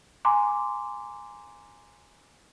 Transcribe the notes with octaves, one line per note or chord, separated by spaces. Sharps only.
G#5 A#5 C6 D6